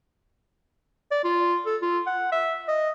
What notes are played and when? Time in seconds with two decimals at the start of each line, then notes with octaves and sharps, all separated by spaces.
1.11 D5
1.24 F4
1.66 A4
1.82 F4
2.07 F#5
2.32 E5
2.68 D#5